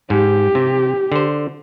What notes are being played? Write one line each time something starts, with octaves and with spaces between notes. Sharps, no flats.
G#2 G4
C3
D3 C5